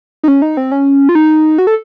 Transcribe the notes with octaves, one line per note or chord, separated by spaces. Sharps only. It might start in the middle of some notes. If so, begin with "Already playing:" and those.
D#4
C#4
D#4
C4
C#4
F4
D#4
F#4
A4